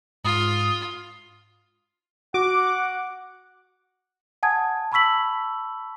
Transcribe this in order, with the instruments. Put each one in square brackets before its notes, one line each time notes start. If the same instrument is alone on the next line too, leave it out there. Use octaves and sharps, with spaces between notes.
[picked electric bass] G#2 [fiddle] F4 [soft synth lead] D#6
[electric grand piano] F#4 [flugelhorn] F#5 [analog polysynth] D6
[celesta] F#5 G#5 A5 D#6 G#6
A5 B5 C#6 E6 B6 F#7